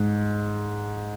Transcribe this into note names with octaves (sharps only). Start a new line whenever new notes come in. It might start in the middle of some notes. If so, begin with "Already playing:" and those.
Already playing: G#2